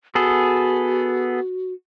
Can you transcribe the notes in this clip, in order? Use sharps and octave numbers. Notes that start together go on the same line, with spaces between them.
B3 F#4 G#4 A4